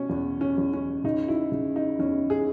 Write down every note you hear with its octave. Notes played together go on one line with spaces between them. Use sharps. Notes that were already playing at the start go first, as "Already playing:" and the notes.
Already playing: B2 C#4
E2
C#4
E2
C#4
C#3 D#4
E4
C#3
D#4
E2 C#4
G#4